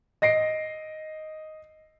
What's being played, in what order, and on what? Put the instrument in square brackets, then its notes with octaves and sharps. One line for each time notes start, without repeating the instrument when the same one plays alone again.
[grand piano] D#5 A#6 C7 D7